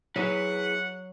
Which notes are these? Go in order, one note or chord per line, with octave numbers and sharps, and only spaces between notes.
F#3 E4 G#4 B4 F#5